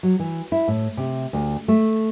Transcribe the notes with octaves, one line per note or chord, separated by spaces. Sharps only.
F#3
E3
E4
A2
C3
D2
A3